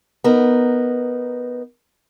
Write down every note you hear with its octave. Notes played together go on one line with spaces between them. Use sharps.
B3 D#4 A#4